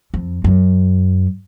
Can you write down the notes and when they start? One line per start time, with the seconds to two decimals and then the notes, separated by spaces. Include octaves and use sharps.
0.14 F2
0.44 F#2